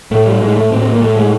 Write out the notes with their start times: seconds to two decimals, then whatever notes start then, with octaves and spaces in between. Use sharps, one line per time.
0.11 A2 A3
0.26 G3
0.41 A2 G#3
0.56 A3
0.71 A2 C4
0.82 C4
0.92 A#3
1.01 A2 A3
1.17 G#3